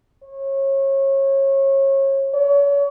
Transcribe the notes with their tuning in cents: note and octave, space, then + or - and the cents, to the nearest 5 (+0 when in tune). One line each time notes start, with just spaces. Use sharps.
C#5 -30
C#5 +35